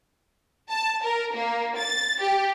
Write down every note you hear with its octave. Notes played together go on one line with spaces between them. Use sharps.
A5
A#4
A#3
A6
G4